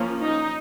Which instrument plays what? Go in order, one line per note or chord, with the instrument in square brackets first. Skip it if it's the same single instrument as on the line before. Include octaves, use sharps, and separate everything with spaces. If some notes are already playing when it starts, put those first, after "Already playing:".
Already playing: [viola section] F3 A#3 C#4
D#4